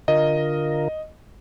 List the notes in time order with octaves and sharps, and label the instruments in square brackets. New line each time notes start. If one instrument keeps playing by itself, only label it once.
[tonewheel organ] D3 F4 A#4 [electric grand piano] D#5